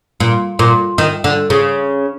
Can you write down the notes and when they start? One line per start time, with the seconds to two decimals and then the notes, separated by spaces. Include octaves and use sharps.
0.20 A#2
0.59 A#2
0.98 D#3
1.24 D3
1.50 C#3